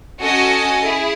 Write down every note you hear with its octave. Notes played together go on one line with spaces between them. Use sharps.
C#4 F#4 A4 D#5 G#5
E4 G#4